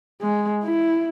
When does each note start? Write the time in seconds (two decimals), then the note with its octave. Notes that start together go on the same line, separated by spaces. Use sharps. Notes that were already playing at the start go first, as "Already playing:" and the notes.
0.22 G#3
0.64 E4